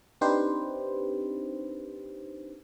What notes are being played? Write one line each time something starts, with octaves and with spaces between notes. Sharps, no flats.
C4 D4 D#4 G4 B4 C5